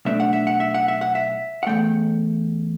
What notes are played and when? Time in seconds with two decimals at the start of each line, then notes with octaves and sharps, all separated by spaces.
0.05 B1 B2 A3 D4 E5
0.20 F#5
0.33 E5
0.47 F#5
0.60 E5
0.74 F#5
0.88 E5
1.01 F#5
1.15 E5
1.63 F#5
1.66 E2 B2 A3 G5